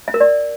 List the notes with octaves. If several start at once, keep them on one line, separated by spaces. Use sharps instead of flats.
E5
A#4
D5